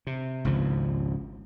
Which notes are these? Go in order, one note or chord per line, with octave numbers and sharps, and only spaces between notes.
C3
G#1 C#2 C#3 F3